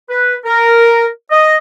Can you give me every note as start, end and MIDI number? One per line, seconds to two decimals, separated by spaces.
0.10 0.35 71
0.45 1.06 70
1.31 1.57 75